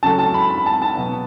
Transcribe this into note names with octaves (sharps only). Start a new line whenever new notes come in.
C#3 F#3 A3 A5
A5
B5
B5
A5
A5
B2 F#3 B3